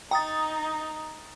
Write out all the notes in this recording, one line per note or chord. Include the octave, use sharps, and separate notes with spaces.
D#4 G5 A#5 D#6 A6